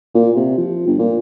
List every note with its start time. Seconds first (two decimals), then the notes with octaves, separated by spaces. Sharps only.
0.15 A#2
0.36 C3
0.58 F3
0.87 G1
0.99 A#2